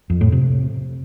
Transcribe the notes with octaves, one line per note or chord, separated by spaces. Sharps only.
F2
A2
C3